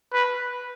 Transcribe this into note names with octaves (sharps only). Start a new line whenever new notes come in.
B4